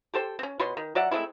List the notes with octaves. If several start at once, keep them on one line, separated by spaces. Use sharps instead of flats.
G4 A4 C5 G5
C4 C#4
B2 B4 C#5 C6
D#3
F#3 D5 E5 F#5
G#3 A3 C4 E4